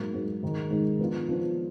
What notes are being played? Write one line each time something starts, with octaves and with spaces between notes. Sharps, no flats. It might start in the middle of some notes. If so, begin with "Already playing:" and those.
Already playing: G#2 F#3 A#3
G#2 F#3 A#3
G#2 D#3 G#3
G#2 D#3 G#3
F3 B3 D4 F4
F3 B3 D4 F4